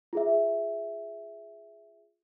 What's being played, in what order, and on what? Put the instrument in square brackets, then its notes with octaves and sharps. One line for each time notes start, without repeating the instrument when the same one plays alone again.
[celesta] F4 G#4 E5